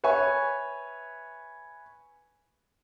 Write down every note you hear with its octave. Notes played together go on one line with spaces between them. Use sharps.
B4 C#5 E5 G#5 C#6